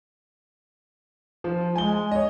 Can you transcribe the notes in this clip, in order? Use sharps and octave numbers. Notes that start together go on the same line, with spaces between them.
F3
G#3 G#5 G7
C#5 D#5